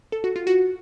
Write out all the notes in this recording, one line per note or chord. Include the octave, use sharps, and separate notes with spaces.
A4
F#4
F4
F#4